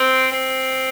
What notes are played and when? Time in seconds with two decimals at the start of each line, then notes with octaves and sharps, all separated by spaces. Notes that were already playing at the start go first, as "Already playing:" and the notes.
Already playing: C4
0.31 C4